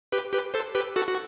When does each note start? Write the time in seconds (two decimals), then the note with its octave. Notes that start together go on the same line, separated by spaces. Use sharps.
0.12 G4 B4
0.33 G4 B4
0.54 A4 C5
0.75 G4 B4
0.96 F#4 A4
1.09 F#4